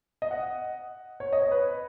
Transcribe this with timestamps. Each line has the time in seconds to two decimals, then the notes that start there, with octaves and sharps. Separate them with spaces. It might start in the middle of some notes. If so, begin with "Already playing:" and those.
0.22 D#5
0.31 F#5
1.20 C#5
1.33 D#5
1.42 C#5
1.51 B4